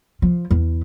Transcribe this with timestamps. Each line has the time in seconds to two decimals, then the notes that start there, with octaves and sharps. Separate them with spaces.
0.22 F3
0.51 E2